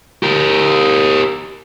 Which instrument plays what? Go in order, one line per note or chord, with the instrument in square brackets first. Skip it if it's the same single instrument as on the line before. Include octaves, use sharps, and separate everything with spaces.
[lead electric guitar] G4 A#4